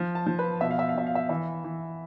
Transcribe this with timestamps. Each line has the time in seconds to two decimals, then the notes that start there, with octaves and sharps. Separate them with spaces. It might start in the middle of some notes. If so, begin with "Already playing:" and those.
Already playing: F3
0.15 A5
0.26 F3
0.39 B4
0.61 B2 E5
0.71 F5
0.79 E5
0.89 F5
0.95 B2 E5
1.06 F5
1.15 E5
1.29 E3 E5
1.64 E3